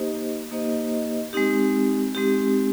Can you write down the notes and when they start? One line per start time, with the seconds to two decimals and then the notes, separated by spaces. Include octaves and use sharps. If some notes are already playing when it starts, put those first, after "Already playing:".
Already playing: A#3 D#4 G4 C5 D#5
0.51 A#3 D#4 G4 C5 D#5
1.33 G#3 C4 D#4 G4
2.15 G#3 C4 D#4 G4